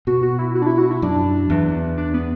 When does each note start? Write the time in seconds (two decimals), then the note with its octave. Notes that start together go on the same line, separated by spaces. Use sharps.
0.07 B2 F#4
0.22 F#4
0.39 E4
0.55 F#4
0.62 D4
0.67 E4
0.78 F#4
0.91 E4
1.02 F#2 D4
1.50 E2
1.97 D4
2.14 B3